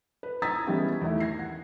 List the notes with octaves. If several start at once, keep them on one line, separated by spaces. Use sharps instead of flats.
B4
A#5 D#6 E6 G#6 A6 B6
E3 G3 G#3 B3 C#4 G4
E2 D#3 A3 E4
G#6 A#6 C7
F#5